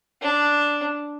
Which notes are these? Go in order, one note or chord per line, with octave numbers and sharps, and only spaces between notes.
D4